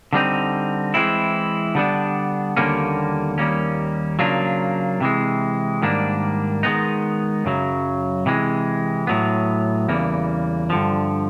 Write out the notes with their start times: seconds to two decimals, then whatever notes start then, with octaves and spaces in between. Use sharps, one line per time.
0.13 D3 G3 C4 D#4
0.94 E3 G#3 C4 E4
1.75 D3 G3 B3 D4
2.57 D#2 D3 G3 A#3 C#4
3.38 D#2 D#3 G3 A#3 C#4
4.19 C#3 F#3 A#3 D4 F4
5.00 C3 E3 G#3
5.82 G#2 D#3 G3 A#3 D4
6.63 D#3 G#3 B3 D#4
7.45 F#2 C#3 F#3
8.26 C3 E3 G#3
9.07 A2 F#3 B3
9.88 E2 C#3 E3 G3 A#3
10.70 G2 D3 F3